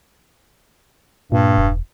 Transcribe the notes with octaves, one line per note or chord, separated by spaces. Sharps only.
G2 A#2
E1